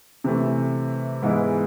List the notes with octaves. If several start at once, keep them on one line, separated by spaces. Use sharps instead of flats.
C3 E3 A3
G#2 E3 G#3 B3 E4